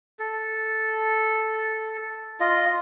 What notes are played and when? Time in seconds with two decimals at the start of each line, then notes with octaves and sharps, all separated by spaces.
0.19 A4
2.40 F4 D#5